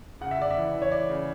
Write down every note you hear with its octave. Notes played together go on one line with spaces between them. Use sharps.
C#3 F#5
E5
C#3 D5
E5
E3
E3
C#5
E3 D5
C#3